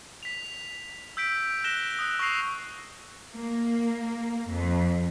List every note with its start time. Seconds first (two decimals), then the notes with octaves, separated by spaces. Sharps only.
0.23 B6 F7
1.17 E6 G6 B6 D7
1.64 F#6 A#6 E7 G7
1.99 D#6 E6 F#6
2.19 C#6 E6 A#6 C7 F7
3.33 A#3
4.47 F2